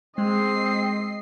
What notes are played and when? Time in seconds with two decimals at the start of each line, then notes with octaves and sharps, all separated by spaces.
0.18 G#3 C4 D#5 C7